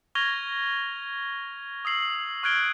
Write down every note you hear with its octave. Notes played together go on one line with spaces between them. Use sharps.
C#6 F6 G#6 A#6 F7 G7
D#6 E6 C7 F#7
C#6 F6 F#6 G#6 D7 G7